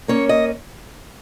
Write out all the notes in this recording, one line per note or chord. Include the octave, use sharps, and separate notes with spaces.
A#3 C#4 C#5
D#5